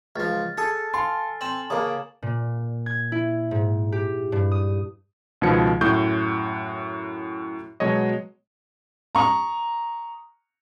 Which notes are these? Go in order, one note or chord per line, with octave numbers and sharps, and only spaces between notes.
C#2 F3 F6 A6
G#4 A4 D#6 A6
F5 G#5 C6
C4 E7 F#7
C#3 A#3 D#6
A#2
G#6
E4
G#2
G4
G2
D#6
C#2 B2 D#3 F3 G#6 C#7
F#2 A2 F#4 C#6 G6
B2 F#3 G#3 C#5 D#5
A#5 C#6 D#6